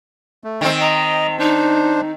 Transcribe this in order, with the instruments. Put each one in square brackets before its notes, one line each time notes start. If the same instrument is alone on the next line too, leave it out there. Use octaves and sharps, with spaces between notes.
[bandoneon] A3
[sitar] D#3 C4
[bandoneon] D#5 [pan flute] A#5
[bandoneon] D4 C5 [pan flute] D#4